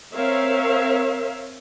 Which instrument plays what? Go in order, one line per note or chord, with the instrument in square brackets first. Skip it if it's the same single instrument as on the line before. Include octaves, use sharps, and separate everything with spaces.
[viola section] C4 A#4 C#5 E5 F5